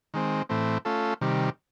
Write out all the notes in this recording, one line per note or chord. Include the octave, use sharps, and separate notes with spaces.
D#3 G#3 C4
A2 E3 A3 C4
A3 C#4 F4 A4
C3 D#3 G3